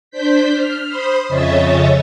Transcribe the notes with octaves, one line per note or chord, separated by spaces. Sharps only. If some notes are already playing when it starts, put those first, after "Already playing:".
D4 C5 G6 B6
F6
C5 B5 C6 D#6
F2 C#3 C#5 D#5 E5 A6